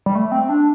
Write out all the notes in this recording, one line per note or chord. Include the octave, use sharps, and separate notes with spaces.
G3
A3
C4
D4